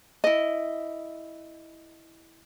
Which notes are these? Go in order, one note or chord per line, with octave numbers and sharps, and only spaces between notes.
E4 D#5